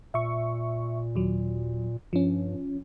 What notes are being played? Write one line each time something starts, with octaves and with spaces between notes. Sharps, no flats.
A#2 E5 C#6
D#2 F#3
G2 F3 C#4